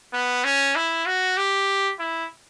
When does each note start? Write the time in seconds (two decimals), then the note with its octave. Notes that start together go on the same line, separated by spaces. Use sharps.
0.13 B3
0.44 C#4
0.75 E4
1.06 F#4
1.37 G4
1.99 E4